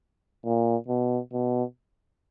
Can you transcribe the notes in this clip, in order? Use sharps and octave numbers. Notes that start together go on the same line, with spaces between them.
A#2
B2
B2